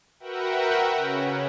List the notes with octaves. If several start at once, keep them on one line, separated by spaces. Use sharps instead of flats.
F#4 A#4 B4 E5 F#5 G5
C#3 C#4